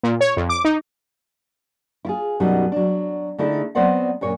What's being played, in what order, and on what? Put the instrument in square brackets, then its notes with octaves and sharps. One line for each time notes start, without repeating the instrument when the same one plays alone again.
[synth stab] A#2
C#5
F2
D6
D#4
[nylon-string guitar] E4 F4 G#4
F#2 B2 F#3 G3 C#4 D#4
F#3 D4
D3 A3 D#4 E4 G#4 A4
F#3 B3 C4 C5 D5 F#5
F#2 A#2 C#5